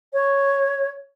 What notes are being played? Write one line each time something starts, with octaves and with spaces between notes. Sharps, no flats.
C#5